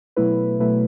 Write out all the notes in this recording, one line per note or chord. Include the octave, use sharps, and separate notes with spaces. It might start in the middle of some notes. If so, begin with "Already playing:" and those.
B2 F#3 A3 E4 B4
B2 F#3 A3 E4 B4